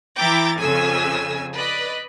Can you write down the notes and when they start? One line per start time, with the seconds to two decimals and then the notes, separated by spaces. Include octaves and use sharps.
0.18 E3 E4 G5 A#5 D6 A6
0.60 F2 C#3 G#5 E6
1.55 B4 D5 D#5